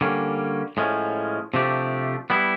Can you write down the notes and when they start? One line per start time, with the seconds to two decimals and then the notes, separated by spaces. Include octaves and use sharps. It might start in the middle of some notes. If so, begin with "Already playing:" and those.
0.01 D3 G3 A#3 C#4
0.77 A2 F3 G#3 C#4
1.54 C3 F3 A3 D4 G4
2.30 G3 B3 E4